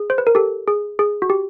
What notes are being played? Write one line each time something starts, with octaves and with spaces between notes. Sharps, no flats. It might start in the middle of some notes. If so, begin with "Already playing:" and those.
Already playing: G#4
C5
B4
A#4
G4 A4
G#4
G#4
F#4
G4